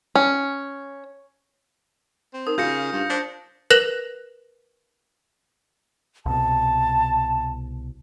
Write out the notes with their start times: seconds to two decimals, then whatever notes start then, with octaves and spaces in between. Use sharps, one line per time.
0.15 C#4
2.34 C4
2.47 D#4 A#4 D#6
2.58 C#3 F4 G6 A#6 C#7
2.93 G2
3.10 D4 C5 A5 C6
3.70 A#4 B4 F#6 A#6 E7 F7
6.26 C2 B2 A5